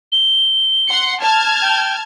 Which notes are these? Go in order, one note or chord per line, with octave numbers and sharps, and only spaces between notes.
G7
F#5 C6 C#7
A5 F6 G#6
G5